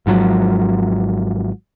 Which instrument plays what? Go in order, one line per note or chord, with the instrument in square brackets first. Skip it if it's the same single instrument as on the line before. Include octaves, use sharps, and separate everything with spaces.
[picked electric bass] G#1 G#2 F3 F#3